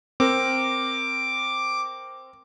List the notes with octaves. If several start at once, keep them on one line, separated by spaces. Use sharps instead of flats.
C4 A#4 D6